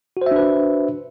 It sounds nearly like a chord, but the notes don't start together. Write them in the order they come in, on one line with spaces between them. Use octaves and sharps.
F#4 C5 E5 D4 B4